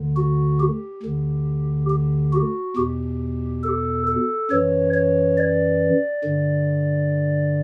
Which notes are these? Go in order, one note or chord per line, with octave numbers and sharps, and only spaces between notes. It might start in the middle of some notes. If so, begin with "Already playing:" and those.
Already playing: D2 D3
F#4
G4
D2 D3
G4
F#4
E2 B2 G4
A4
A4
F#2 E3 C#5
C#5
D5
G2 D3